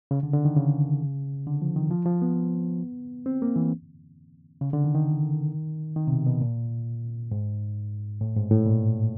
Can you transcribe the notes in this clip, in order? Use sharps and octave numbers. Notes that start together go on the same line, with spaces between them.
C#3
D3
D3
D#3
C#3
D3
F3
D#3
F3
F3
B3
C4
A#3
E3
C#3
D3
D#3
D#3
D#3
C3
B2
B2
A#2
G#2
A2
G#2
A2
A#2